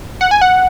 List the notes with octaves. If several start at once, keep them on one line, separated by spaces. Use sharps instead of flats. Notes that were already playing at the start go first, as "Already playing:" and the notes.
F#5
G#5
F#5